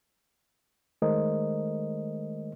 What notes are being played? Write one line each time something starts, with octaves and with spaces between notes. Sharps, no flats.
D#3 G#3 A3 A#4 C5 D#5